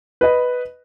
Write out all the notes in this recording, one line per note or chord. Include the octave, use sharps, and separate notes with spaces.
B4 D#5